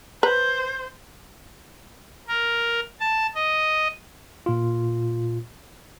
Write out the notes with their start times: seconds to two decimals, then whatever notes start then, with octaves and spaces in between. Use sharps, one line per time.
0.23 B4 C5 A#5
2.28 A#4
3.00 A5
3.35 D#5
4.46 A#2 F4